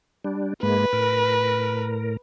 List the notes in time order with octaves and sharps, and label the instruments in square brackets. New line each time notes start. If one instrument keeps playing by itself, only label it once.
[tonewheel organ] G3 D4
[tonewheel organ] G#2 G#3 A#3 [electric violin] B4
[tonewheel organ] A2 A#4